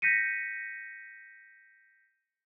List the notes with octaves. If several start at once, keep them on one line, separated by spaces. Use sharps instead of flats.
G6 A#6 B6 C#7 D#7